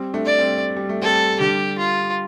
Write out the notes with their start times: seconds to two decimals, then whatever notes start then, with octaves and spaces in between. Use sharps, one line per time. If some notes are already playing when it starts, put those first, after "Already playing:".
Already playing: G3 C4
0.14 A3 D4
0.26 D5
0.38 G3 C4
0.77 G3
0.89 A3
1.02 G3 C4 A4
1.40 D3 G3 G4
1.78 F4